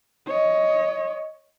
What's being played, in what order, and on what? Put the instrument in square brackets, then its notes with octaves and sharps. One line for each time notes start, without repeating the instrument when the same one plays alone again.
[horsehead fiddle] C#5 D#5